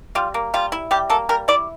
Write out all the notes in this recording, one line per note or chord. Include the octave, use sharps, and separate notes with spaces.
G3 F4
A#3
G3 F4
E4
G3 G4
A#3 A4
G3 A#4
E4 D5